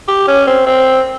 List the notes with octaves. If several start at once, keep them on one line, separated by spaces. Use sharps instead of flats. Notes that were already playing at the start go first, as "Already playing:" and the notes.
G4
C#4
C4
C4